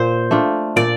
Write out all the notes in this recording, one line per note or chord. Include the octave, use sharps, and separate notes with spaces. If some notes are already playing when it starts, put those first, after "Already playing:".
Already playing: A#2 C5
A3 D4 F4
A#2 D5